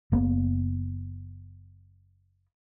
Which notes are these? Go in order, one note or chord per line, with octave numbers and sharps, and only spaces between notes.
F#1 A#3 B3